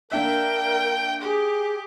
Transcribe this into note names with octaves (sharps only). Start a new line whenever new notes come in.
A#3 D4 A#4 E5 G5
G4 G#4